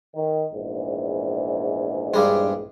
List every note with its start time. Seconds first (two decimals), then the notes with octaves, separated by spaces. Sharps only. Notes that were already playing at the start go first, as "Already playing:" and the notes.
0.14 D#3
0.51 A#1 E2 G#2
2.14 G2 G3 G#3